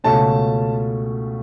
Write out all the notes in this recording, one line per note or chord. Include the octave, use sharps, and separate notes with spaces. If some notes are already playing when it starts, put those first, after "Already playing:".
C#2 B2 A3 C#4 A5